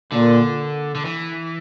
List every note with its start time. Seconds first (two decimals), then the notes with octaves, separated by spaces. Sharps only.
0.12 A#2 D3
0.95 D3
1.05 E3